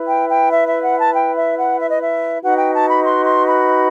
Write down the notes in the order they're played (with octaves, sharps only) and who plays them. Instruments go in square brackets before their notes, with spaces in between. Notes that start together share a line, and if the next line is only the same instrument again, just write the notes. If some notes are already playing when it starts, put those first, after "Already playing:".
Already playing: [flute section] E4 B4
G5
G5
E5
E5
F#5
A5
G5
E5
F#5
E5
D#5
E5
D#4 F#4 B4 F#5
G5
A5
B5
C6
C6
B5